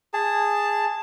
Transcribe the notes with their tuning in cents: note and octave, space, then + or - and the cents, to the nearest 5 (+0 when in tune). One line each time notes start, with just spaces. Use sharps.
G#4 -10 A5 +0